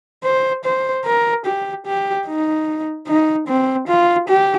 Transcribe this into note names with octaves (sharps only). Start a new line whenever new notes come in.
C5
C5
A#4
G4
G4
D#4
D#4
C4
F4
G4